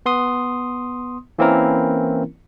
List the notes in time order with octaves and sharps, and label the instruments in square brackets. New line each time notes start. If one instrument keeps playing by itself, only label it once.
[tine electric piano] B3 C6 D#6
E3 A#3 C4 C#4 E4 A#4